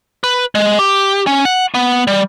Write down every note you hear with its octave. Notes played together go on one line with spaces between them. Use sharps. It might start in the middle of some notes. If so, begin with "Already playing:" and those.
B4
G#3
G4
C#4
F#5
B3
G3